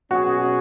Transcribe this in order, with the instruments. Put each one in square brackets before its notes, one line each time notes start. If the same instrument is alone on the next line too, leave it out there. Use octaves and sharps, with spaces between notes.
[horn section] B2 F#3 C#4 G#4 [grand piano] F#4